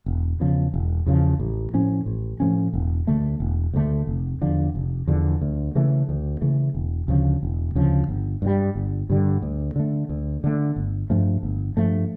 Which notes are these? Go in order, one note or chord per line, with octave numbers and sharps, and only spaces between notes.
E1
E2 C#3 F3
E1
E2 C#3 F3
A1
A2 F3 C#4
A1
A2 F3 C#4
E1
D2 D3 A3
E1
D2 D3 A3
F1
E2 D3 F3
F1
E2 D3 F3
D2
C#3 E3 A3
D2
C#3 E3 A3
E1
D2 C#3 F3
E1
D2 C#3 F3
G1
G2 D3 G3
G1
G2 D3 G3
D2
D3 A3
D2
D3 A3
G1
G2 F3 A3
G1
G2 F3 A3